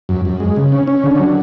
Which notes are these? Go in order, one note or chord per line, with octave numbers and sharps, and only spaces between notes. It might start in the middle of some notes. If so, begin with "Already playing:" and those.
F#2
F#2
G#3
C#3
C#4
C#4
D3
F#3